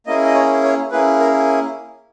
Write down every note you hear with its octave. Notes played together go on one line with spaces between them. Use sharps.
A#3 C#4 E4 G#4 D#5
D#5
C#5
C#5
A#3 C#4 E4 G#4 B4
A#4